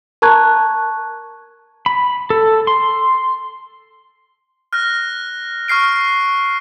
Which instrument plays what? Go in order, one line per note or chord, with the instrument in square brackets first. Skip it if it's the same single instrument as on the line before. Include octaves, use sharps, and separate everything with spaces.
[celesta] A#4 A5 A#5 C#6 F#6 G#6
[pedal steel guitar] B5
A4
C6
[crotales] F6 F#6 A#6
C#6 F6 C7 D7